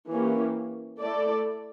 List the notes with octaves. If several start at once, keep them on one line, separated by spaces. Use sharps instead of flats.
E3 A#3 C#4 G4
A3 E4 A4 D5